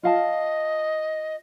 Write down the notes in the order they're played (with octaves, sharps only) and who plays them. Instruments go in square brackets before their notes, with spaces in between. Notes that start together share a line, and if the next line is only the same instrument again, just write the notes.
[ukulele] F4 F5 A5 [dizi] D#5